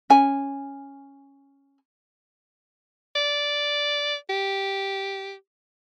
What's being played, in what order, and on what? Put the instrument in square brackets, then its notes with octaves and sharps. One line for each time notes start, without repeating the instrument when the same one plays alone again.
[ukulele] C#4 G#5
[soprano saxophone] D5
G4